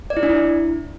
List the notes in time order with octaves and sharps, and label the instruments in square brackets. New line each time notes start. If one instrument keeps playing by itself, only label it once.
[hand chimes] D5
E4
D4
E4